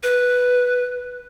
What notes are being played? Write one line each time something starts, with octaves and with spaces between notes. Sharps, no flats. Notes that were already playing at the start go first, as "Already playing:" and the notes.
B4